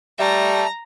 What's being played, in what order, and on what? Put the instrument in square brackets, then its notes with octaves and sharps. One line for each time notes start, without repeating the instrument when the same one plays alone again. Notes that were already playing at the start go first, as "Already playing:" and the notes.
[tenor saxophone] G3 [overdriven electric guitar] E5 A5 [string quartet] A#5